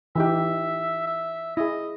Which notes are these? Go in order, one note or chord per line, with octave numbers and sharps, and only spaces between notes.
E3 D#4 G4 E5
E5
E4 G#4 D#5